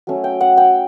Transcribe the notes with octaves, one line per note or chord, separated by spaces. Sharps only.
F#3 A3 C#4
G5
F#5
G5